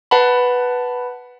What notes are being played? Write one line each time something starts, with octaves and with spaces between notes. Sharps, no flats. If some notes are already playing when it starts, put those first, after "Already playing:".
B4 F#5 A5 B5